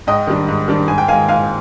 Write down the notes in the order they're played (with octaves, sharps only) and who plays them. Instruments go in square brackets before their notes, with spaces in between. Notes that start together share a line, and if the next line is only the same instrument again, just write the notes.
[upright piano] G#2 D#5 G5
D#3 G3 D4
G#2
D#3 G3 D4
G#2 G#5
G5
D#3 F5 G#5
G#3
G#2 F5 G#5